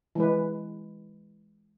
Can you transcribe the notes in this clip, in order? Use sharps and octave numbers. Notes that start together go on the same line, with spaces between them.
E3 G#3 B4